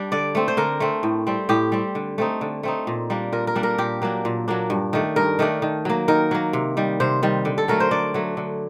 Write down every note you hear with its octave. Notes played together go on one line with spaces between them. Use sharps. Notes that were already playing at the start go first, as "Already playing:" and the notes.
Already playing: G3 D4
D3 D5
A3 C4
C5
D3 A#4
A3 C4
A2
G3 C4
A2 G4
G3 C4
D3
A3 C4 D#4
D3
A3 C4 D#4
A#2
G3 A#3 D4
A#2 A#4
A#4
G3 A#3 D4
A#4
A#2 G4
F#3 A#3 D4
A#2
F#3 A#3 D4
G2
D#3 A3 D4
G2 A#4
D#3 A3 D4
D#3
F#3 A#3
D#3 A#4
F#3 A#3
C3
D#3 G3
C3 C5
D#3 G3
D3
A4
F#3 A3 A#4
C5
D3 D5
F#3 A3
D3